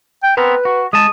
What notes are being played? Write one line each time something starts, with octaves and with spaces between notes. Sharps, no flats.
G5
B3 C4 A#4 B4
F#4
G#3 A5 D#6